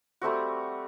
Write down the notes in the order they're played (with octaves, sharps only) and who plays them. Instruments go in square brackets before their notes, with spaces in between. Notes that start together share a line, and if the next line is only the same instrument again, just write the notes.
[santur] G3 A3 C4 F#4